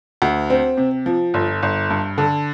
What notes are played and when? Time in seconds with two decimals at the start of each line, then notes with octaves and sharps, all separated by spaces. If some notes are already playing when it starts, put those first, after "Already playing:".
0.22 D2
0.50 C4
0.77 C3
1.06 F3
1.34 G1
1.63 G1
1.90 G2
2.18 D3